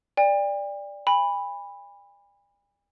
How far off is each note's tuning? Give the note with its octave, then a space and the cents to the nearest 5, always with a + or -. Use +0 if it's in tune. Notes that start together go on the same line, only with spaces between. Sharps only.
D5 +0 G5 +40
G#5 -45 B5 +0